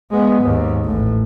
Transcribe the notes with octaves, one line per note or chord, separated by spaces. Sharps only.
G#3 B3
D#2 G#2
A1 A2